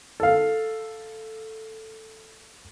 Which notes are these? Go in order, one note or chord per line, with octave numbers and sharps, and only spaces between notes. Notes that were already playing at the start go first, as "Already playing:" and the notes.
A4 F5